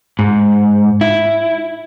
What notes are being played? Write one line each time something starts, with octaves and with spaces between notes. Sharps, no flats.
G#2
E4